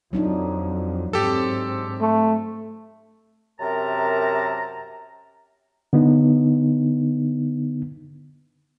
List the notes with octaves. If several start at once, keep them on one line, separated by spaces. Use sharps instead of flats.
F2 F#3 D4 D#4
G#2 C4 G4 A4
A3
F#2 C3 A#4 A5 A#5
D3 B3 D#4